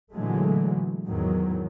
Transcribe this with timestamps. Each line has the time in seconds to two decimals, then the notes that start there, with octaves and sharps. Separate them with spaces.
0.12 A#2 D3 E3 F#3 G#3 A3
1.07 E2 G#2 D#3 F#3